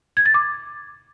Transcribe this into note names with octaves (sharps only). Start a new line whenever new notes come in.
G#6
A6
D6